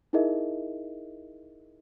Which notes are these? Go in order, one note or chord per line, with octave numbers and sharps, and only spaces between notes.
D#4 E4 G#4 A#4 D#5 E5